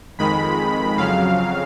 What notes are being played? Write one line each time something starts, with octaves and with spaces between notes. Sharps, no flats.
F2 D#3 G#3 B5
F2 C#3 F#3 F5